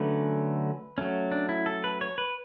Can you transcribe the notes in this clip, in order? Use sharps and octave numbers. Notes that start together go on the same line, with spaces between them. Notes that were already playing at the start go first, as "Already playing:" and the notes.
Already playing: D3 F#3 A3 C#4 B4
F#3 A3 C#4
D4
E4
A4
B4
C#5
B4